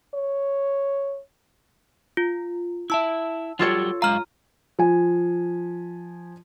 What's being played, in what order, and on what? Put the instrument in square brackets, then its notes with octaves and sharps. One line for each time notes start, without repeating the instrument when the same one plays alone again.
[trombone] C#5
[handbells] F4
[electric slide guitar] E4 E5 [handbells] A5 E6
[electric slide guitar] F#3 G3 G4 [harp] F4 A4 C#5
[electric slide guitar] F#2 G#3 F5 [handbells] A#5 F6
[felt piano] F3 G#5